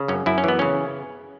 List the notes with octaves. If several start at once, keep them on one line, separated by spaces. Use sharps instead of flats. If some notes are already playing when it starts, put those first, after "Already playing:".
Already playing: C#3
F#2 C#4
F#2 E4
C#4
E3 B3
C#3 C#4